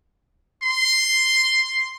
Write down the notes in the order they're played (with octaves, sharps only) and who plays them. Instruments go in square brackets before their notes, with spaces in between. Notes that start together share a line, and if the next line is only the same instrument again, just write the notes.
[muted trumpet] C6